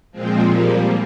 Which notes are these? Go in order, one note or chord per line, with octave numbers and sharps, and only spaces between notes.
A#2 F3 G#3 C4
G3 A#3